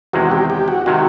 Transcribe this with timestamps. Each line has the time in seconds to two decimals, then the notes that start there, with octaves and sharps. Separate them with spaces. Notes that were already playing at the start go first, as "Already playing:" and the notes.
0.13 E2 C3 D#3 G#3 F#4
0.31 G4
0.50 G4
0.68 F#4
0.86 C3 D#3 G#3 F#4